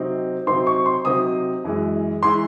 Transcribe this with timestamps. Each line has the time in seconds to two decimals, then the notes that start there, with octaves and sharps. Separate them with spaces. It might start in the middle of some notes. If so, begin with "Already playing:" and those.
Already playing: C3 F#3 C4 D#4
0.47 C3 F#3 C4 D#4 C6
0.67 C#6
0.86 C6
1.05 C3 F#3 C4 D#4 D#6
1.64 F#2 E3 G#3
2.23 E3 G#3 C6